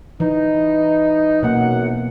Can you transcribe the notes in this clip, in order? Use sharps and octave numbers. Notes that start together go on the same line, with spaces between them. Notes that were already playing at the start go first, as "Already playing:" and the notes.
E3 D#4
F#2 B2 A#3 F#5